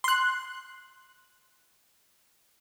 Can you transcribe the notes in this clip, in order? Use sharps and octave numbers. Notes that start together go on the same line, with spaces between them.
C6 F#6